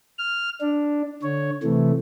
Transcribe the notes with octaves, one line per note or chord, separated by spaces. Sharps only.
F6
D4
D3 C#5
C3 E3 A3